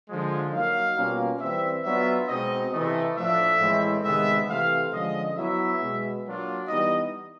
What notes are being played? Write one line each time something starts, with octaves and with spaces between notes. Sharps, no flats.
D3 F3 G#3
F#3 A#3 D#4 F5
B2 G3 A#3 C#4 F4
E3 G3 C4 E5
F#3 B3 D4 F4 E5
B2 G#3 C4 D#4 D#5
C3 E3 A3 D#5
A2 F3 A3 D4 E5
A2 E3 G#3 C4 E4
C3 D#3 G#3 B3 E5
C3 E3 A3 F5
D3 F3 G#3 C#4 D#5
F#3 B3 E4 E5
B2 G#3 B3
F#3 A#3 D4 F4
E3 G3 B3 D#4 D#5